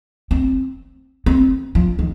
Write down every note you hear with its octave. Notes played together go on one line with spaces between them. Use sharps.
C4
C4
F3
D#3